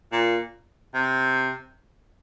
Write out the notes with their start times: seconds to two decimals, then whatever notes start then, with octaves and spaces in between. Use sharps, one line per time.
0.12 A#2
0.94 C3